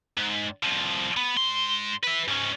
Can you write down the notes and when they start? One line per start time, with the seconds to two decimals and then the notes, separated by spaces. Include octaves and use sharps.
0.17 G#2
0.63 C2 F3
1.17 B3
1.37 G#2 C6
2.03 B4 E5
2.28 G#2 C#4